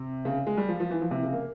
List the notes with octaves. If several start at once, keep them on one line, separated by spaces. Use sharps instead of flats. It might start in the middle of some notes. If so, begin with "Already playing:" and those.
Already playing: C3
C#3
G#3
G3
F3
F3
E3
F3
C3
C#3
A#3